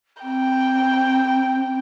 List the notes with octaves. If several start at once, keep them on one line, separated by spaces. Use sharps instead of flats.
C4 G5